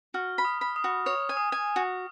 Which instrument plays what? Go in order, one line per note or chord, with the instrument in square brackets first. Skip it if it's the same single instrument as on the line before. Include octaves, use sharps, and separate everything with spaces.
[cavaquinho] F#4 [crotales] F6
[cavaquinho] B5
[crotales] D#6
[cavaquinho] B5
[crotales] D#6
[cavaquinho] F#4
[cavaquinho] C#5 [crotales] D#6
[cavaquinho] G#5
[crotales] D#6
[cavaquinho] G#5
F#4